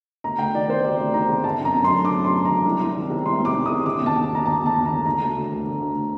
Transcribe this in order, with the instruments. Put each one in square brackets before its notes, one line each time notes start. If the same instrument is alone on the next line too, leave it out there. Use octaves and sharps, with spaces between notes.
[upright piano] D2 A#5
D2 G5
D#3 D5
C3 C5
D2 D5
D2
D#3 A#5
C3
D3 A5
F#2 A#5
F#2
C6
D3
D3 D6
F#2 C6
F#2
D3 A#5
C2
C2
D#3
C3
C2 C6
C2
D6
D#3
C3 D#6
D3 D6
D#2
A5
D#2
D3 A#5
D3 A5
D#2
A5
D#2
A#5
D3
D3 A#5
D2
D2
D3
D3
D2